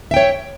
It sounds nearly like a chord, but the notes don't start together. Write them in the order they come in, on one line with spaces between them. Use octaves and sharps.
E5 G5 C#5